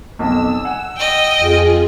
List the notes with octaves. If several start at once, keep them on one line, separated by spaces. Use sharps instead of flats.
B1 F2 E6
F#5 G#5
D#5 G5
F2 F4 G#4